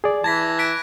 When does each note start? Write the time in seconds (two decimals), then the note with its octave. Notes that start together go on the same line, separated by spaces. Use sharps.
0.04 G#4 D5
0.24 E3 A5 G#6 A#6 B6
0.58 F#6 B6 D7